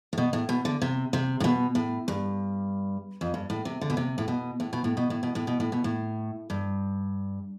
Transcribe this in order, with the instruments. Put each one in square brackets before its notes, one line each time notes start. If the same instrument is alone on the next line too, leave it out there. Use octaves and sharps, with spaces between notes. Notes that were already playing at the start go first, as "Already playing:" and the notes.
[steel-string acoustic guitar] A2
B2
A2
B2
D3
C3
C3
A2
B2
A2
G2
F2
G2
A2
C3
D3
B2
C3
A2
B2
A2
B2
A2
B2
A2
B2
A2
B2
A2
B2
A2
G2